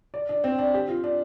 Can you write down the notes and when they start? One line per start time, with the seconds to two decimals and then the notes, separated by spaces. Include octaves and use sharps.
0.14 D5
0.29 D4
0.44 C4
0.58 D4
0.74 G4
0.89 F4
1.04 D4